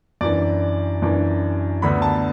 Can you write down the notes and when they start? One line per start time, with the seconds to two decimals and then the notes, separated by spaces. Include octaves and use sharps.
0.21 F#2 E3 D4 D5
1.02 F#2 E3 D4
1.82 D2 D3 B3 B5
2.02 A5